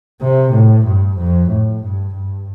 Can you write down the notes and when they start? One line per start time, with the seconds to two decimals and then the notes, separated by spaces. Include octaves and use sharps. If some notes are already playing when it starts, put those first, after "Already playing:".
0.22 C3
0.53 A2
0.86 G2
1.18 F2
1.50 A2
1.83 G2
2.15 G2